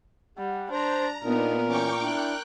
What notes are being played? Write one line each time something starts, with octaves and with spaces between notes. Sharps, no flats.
G3 G4 F#5
D4 C5 A#5
A#2 B3 D4 D#4 A#4
E3 C#4 G5 C#6 D6
D4 E4 G5 F#6